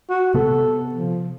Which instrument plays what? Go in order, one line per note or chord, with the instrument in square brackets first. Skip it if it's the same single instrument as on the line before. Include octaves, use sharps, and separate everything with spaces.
[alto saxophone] F#4
[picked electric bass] C3 B3 [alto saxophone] A4
[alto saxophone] F3